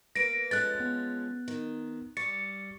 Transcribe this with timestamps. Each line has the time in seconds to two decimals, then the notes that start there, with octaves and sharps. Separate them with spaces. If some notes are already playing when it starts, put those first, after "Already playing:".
0.15 A#3 B4 A#6 D7
0.51 F3 G#3 C#4 A4 B4 F#6 A6
0.80 B3
1.48 D#3
2.17 G3 C#6 A6 C#7